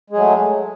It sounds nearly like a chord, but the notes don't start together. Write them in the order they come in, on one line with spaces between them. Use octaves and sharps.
G#3 G#4 F#3 A3